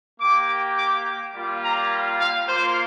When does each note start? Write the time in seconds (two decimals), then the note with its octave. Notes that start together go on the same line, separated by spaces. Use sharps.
0.19 A#3 G4 D6
0.76 D6
1.33 G3 A#3 F4
1.62 A#5
2.19 F5
2.46 A#3 F4 C5